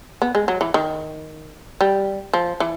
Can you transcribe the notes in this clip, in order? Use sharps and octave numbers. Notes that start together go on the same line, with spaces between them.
B3
G#3
F#3
E3
D#3
G3
F3
E3